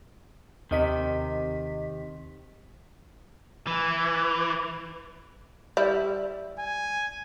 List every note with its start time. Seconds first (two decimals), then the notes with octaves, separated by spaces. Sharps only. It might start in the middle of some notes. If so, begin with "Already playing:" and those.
0.71 D#2 C3 D#3 D#5 B6
3.67 E3
5.77 G3 E4
6.59 G#5